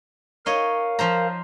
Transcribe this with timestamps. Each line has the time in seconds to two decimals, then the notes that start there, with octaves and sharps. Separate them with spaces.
0.46 D#4 A#4 C#5 D#5 F5
0.99 F3 C5 A#5